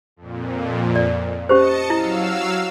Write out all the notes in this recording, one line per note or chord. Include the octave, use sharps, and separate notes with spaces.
F2 A#2
D5
C#4 G4 C5 D#5 A5 C#7
F#3 E4 F5 E6